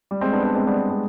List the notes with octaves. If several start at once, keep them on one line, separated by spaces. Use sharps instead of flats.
G3
G#3 C4
B3 D4
B3 D4
G#3 C4
G3 B3
G3 B3
G#3 C4